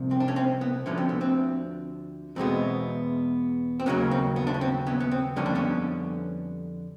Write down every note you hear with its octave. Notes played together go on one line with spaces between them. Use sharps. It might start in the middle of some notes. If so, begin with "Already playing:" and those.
Already playing: C2 C3 F3
C4
D4
C#4
C4
B3
D2 D3 F3 C#4
C4
B3
C4
E2 B2 G#3 B3 C4
C4
D#2 C#3 F#3 A#3 B3 C#4
C4
B3
D4
C#4
C4
B3 C#4
B3
C4
F2 D3 G3 A#3 C#4
D4
B3 C#4